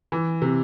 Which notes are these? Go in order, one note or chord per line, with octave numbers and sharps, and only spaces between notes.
E3
C3